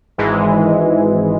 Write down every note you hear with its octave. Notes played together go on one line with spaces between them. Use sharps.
G#1 G#2 E3 G#3